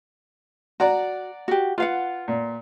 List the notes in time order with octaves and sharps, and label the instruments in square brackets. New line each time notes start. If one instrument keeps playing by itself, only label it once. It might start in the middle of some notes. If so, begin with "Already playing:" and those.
[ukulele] F#4 [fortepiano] D5 F#5 A#5
[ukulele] F#4 G4
[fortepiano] F4 [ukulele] B4 F5 F#5
[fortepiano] A#2